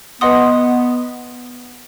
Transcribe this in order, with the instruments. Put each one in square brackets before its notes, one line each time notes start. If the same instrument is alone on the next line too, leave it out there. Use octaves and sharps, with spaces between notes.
[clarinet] B3 [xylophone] B4 D#5 F#5 C6 D#6